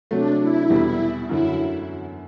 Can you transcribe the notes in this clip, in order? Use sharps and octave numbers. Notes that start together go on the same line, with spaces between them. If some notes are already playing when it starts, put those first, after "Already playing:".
C3 F#3 A3 D4
E4
E2 B2 G3
F#2 D3 F#3 E4